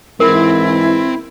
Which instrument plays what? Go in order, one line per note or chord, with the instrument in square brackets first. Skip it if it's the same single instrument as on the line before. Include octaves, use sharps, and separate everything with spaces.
[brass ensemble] G#2 E3 [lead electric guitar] C4 [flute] E4 [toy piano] A#4